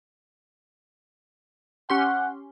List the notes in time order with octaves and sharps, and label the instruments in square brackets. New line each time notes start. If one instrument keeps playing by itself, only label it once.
[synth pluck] C#4 G4 C6 [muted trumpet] F#5